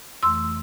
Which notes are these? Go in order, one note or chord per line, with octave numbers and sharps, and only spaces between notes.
F2 E3 A3 C6 E6